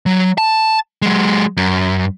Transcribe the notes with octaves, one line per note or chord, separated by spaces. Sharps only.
F#3
A5
F#3 G#3
F#2